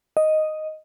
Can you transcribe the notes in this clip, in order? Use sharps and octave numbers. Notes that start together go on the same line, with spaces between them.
D#5